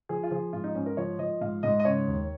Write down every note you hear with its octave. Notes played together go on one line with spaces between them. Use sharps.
F3 G#4
F4
F3 G#4
G#2 F4
D#4
G#2 C#4
A#4
F3 C#5
F3 D#5
G#2 F5
G#2 D#5
D#5
C#3 C#5
D#2